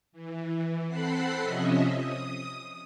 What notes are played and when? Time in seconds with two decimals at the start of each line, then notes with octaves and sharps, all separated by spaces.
0.12 E3
0.88 C4 A4 F#5 B5 F#6 C7
1.42 C3 F3 C#4 D#5 E5
1.89 D#6